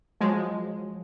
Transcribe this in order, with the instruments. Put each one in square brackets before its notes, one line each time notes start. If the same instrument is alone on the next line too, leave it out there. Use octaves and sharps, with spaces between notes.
[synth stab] F3 F#3 G#3